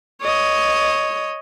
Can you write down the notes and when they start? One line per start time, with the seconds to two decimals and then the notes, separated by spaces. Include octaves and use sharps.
0.22 C#5 D#5